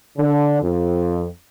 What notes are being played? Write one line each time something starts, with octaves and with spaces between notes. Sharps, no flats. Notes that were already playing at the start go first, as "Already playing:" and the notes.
D3
F2